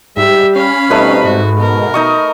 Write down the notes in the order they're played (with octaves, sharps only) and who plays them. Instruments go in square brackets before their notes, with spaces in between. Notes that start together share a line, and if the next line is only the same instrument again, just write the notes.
[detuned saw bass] G#2 [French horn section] G3 G4 [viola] E5
[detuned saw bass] C#4 [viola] F5 B5
[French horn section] B2 G3 C4 [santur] A3 D#4 B4
[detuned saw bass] G#2 [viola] F#4
[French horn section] B2 [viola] A#4
[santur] D#4 D#5 C#6